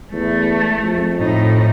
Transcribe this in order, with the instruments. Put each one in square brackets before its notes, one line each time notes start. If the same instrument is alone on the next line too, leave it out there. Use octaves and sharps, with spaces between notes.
[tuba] E2 [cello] A3
[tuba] F2
[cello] A2 D#4